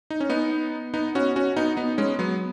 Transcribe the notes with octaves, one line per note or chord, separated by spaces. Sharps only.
D#4
C#4
B3 D#4
B3 D#4
C#4 F#4
C#4 F#4
B3 D#4
B3 D#4
G#3 C#4
F#3 B3